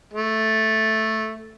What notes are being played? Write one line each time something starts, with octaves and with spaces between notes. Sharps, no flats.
A3